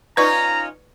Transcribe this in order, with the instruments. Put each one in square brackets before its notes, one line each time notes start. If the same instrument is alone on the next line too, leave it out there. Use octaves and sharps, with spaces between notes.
[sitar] C#4 D#4 F4 [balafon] B4 D5 C#6 [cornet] A#5